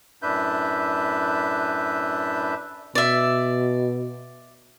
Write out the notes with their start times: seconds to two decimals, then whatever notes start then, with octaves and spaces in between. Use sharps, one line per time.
0.22 F#2 A2 D4 B4 E5 G6
2.95 B2 D5 E5